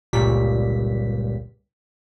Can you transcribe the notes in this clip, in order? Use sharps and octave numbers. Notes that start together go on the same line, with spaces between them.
G1 C#2 A#2 G3 B6